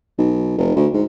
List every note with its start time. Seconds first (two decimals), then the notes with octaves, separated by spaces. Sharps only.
0.18 B1
0.58 F1
0.75 D2
0.93 G#2